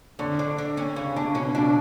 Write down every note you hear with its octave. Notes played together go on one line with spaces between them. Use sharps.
D3 C#4
D4
D4
C#4
C#3 C#4
C#3 D4
B2 C#4
B2 D4